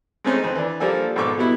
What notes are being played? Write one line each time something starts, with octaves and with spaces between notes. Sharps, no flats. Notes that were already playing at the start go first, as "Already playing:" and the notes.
G#3 A3 C4 C#4 D#4
F2 C4
E3 D4
F3 G3 A#3 D4 A4 G#5
B1 G#2 F3 A4 C#6 D6
B2 F#3 G3 B3 E4